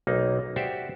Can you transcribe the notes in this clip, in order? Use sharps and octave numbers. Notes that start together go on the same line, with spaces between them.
B1 A#3 D#4
F#4 G4 C5 D5 E5